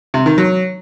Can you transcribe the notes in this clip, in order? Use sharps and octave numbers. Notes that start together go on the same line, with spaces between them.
C3
D#3
F#3